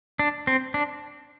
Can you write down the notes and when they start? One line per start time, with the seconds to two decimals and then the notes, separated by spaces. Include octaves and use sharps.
0.19 D4
0.47 C4
0.74 D4